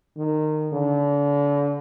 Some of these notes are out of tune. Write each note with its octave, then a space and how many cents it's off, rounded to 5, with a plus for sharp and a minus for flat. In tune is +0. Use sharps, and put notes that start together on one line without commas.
D#3 -20
D3 -35